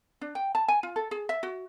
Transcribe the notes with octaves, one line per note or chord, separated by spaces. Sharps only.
D4
G5
A5
G#5
F4
A4
G#4
E5
F#4